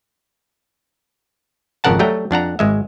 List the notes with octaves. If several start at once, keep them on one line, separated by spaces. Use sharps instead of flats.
G#1 F2 C#3 A#4 F#5 A5
F#3 G3 A3 G5 A#5
F2 D4 F#5 A#5
G#1 G#3 E5